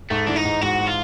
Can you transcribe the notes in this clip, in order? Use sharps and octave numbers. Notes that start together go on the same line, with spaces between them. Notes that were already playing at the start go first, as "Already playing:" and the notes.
G#2 A3
E3 D4
D#4
G#2
G#2 F#4
G#3
F4